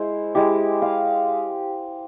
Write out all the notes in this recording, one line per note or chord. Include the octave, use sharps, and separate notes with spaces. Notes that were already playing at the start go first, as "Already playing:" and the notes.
Already playing: G#3 E4 C5
G#3 E4 G4
F5